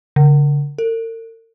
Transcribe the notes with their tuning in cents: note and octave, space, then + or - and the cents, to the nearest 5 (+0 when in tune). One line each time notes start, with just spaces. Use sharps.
D3 -35
A#4 -45